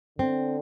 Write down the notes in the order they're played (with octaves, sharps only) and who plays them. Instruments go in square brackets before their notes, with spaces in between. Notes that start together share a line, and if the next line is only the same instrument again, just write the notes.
[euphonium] D3 [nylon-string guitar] C4